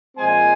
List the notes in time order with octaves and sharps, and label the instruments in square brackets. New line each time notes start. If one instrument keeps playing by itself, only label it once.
[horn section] A#2 F3 G#3 C4 G#5